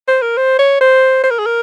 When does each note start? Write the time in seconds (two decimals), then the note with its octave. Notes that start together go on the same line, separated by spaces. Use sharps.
0.08 C5
0.22 A#4
0.37 C5
0.59 C#5
0.81 C5
1.24 C5
1.31 A#4
1.39 G#4
1.46 A#4